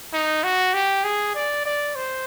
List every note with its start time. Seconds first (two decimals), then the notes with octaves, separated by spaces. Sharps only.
0.13 D#4
0.43 F#4
0.74 G4
1.04 G#4
1.35 D5
1.65 D5
1.95 C5